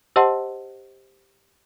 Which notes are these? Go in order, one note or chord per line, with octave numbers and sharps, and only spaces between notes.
G4 C5 D#5 F#5 A5 C6